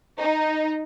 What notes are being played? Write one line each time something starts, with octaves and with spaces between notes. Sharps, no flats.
D#4